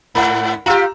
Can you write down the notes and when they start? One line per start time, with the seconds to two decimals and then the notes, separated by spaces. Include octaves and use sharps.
0.15 G#2 F#5 B5
0.66 F4 G4 A#5 E6